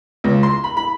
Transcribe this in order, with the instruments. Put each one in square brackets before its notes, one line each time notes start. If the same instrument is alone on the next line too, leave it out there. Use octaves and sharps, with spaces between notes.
[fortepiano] C#2
C6
B5
B5